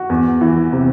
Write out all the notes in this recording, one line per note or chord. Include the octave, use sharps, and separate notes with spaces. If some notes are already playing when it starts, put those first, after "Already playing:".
Already playing: F#4
E2
E3
C3